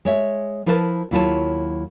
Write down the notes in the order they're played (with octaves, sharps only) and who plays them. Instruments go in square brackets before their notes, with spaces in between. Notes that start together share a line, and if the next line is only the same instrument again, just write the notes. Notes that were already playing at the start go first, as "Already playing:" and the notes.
[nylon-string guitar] G#3 C#5 E5
F3 E4 A#4 B4 D#5 A5
D#2 F#3 E4 F4 C#5 A5